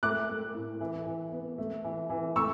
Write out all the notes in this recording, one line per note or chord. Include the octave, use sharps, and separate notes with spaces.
A3 D6 F#6
A3
A2
E3
E3
B3
A3
E3
E3
A3 C#6 E6